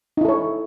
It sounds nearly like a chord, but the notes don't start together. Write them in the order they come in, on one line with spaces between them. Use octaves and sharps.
D#4 E4 A4 C#5